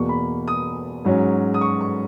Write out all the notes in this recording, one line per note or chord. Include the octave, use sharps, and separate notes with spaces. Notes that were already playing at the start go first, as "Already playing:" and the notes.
Already playing: E2 B2 A#3 C#6
B5
D#6
G#2 F#3 C#4
D#6
C#6
C#6